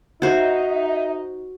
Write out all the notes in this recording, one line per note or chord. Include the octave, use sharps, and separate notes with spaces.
D#4 F#4 C5 E5